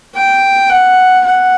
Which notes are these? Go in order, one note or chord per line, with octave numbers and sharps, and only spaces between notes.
G5
F#5
F#5